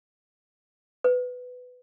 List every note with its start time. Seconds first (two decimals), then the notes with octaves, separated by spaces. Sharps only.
1.04 B4